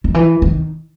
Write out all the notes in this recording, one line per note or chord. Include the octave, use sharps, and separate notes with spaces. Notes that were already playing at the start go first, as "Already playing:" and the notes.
D#3
E3
D#3